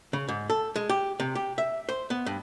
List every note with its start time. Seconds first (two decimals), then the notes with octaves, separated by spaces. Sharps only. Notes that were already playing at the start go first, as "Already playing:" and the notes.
0.13 C#3
0.29 G#2
0.50 A4
0.76 G#3
0.89 G4
1.20 C3
1.35 G4
1.58 E5
1.89 C5
2.10 B3
2.26 G2